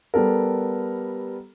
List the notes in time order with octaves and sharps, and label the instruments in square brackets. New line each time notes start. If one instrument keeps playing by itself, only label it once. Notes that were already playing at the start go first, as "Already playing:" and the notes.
[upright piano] G3 B3 A4 A#4